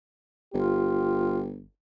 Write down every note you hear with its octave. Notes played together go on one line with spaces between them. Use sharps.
G1 F4 G4